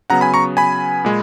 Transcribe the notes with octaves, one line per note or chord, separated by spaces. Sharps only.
C#3 F#3 B3 F#5 A#5
G#5 B5
A#5 C#6
G#5 B5
A#2 G#3